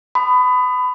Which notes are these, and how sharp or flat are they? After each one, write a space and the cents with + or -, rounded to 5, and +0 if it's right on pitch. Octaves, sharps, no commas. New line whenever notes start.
B5 +25 D#6 -15